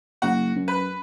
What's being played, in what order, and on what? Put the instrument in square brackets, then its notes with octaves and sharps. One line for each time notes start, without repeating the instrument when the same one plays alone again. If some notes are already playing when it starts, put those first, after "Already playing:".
[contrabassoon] F#1 [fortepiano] F#4
[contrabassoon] F#2
[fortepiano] B4